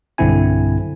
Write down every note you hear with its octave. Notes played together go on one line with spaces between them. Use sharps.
B1 G2 D3 C4 E4 G#5